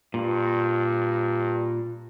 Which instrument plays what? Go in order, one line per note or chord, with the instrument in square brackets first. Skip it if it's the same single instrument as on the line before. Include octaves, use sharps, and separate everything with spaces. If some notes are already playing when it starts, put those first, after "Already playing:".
[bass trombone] G2 [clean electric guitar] A#2